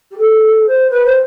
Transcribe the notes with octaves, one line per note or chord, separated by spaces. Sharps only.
G4
A4
C5
B4
C5